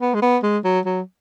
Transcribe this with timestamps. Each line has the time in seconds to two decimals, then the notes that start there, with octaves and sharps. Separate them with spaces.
0.01 B3
0.14 G#3
0.22 B3
0.43 G#3
0.64 F#3
0.86 F#3